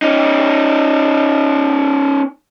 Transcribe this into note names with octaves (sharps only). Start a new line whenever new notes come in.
C#4 D#4